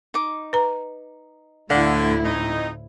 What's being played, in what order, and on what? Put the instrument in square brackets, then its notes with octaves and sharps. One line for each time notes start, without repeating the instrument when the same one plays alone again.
[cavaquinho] D#4 D6
[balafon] B4 A#5
[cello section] D2 A2 E4 [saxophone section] D3 [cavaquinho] F5 F#5
[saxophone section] F2 D#4